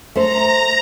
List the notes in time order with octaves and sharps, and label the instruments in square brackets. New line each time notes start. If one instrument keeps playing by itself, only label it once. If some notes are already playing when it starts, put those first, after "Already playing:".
[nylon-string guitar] A3 C5 [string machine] A#5